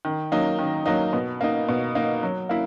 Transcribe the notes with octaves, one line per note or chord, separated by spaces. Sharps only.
D#3
F#3 A#3 D#4
D#3
F#3 A#3 D#4
B2
A#3 D#4
B2
A#3 D#4
F#3
A#3 E4